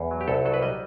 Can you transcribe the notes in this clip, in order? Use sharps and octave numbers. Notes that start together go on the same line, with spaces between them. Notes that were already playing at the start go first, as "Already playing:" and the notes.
Already playing: E2
F#3
G4
C2 A4
F#3 A4
B4
G3 D#5